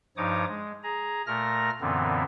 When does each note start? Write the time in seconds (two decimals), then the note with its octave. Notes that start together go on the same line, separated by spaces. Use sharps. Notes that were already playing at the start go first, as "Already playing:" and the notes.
0.17 G2 F3 D#4 C#5 D6 D#6
0.48 G#3
0.83 G#4 A#5
1.27 A#2 A3 A#4 F6 A#6
1.81 F#2 A#2 D3 E3 B3 C4